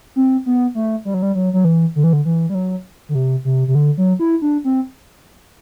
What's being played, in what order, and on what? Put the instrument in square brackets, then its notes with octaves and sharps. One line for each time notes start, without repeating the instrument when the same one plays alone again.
[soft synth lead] C4
B3
A3
G3
F#3
G3
F#3
F#3
E3
D3
E3
D3
E3
G3
F#3
D3
C3
C3
C3
D3
F#3
E4
D4
C4